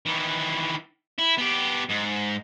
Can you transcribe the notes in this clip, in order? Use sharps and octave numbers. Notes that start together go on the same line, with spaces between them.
D#3 E3
E4
B3 G4
G#2